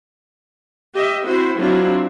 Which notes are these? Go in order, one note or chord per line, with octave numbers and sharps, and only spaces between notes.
G4 D#5 E5
C4 E4 F#4 C5
F#3 C4 D4 E4 F4